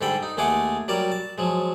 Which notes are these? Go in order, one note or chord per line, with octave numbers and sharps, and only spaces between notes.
G#2 D3 G3 A4 G5 B5
D#4
D#2 G#3 A3 G#4 F#5 D6
F#3 G3 A#4 D5
A5
F3 F#3 G#3